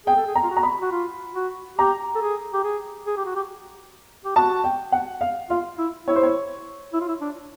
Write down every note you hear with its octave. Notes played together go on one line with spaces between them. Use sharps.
G#4 G5
A4
G#4
A#5
F4
F#4
A#5
B5
F#4
F4
F#4
G4 A#5
A4
G#4
G4
G#4
G#4
G4
F#4
G4
G4
F#4 A5
G5
F#5
F5
F4 F5
E4
E4 C#5
C5
C#5
E4
F4
E4
D4